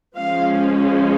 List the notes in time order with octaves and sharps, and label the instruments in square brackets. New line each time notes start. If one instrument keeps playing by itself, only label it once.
[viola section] F3 G#3 C#4 F5